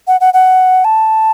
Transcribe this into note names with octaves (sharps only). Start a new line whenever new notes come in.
F#5
F#5
F#5
A5